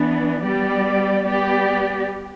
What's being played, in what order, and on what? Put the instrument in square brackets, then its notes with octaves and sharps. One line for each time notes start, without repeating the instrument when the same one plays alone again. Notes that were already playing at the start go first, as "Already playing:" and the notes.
Already playing: [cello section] E3 B3 D4
G3 B3 G4 D5
G3 B3 G4 D5